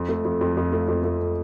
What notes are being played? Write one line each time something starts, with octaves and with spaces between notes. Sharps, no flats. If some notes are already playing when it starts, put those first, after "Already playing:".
Already playing: F2
A3
F2
F2
F2
A3
F2
A3